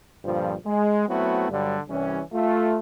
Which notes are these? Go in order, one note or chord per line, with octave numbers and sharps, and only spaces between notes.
G2 A#2 D3 F3
G#3
F#3 A3 B3 C4 E4 F#4
G2 D3 F#3 G3
C2 E3 G3 C#4
A3 F4